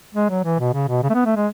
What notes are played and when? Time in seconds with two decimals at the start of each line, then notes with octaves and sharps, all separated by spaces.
0.15 G#3
0.29 F#3
0.44 E3
0.59 B2
0.73 C#3
0.88 B2
1.03 C#3
1.10 A3
1.14 B3
1.25 A3
1.36 G#3